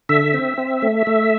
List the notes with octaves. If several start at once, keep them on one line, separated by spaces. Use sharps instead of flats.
D3 E5
C4
C4
A3
A3